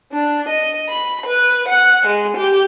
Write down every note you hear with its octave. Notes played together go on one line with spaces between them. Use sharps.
D4
D#5
B5
B4
F#5
G#3
G4